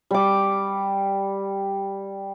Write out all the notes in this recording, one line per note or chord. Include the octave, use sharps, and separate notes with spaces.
G3 D6